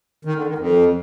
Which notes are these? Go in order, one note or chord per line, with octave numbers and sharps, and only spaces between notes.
D#3
D3
D#3
F2